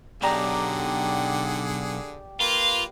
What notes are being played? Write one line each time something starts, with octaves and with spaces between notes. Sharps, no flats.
B1 D3 G4 G#4 D5 F#5 A#5
A#3 F4 B4 F5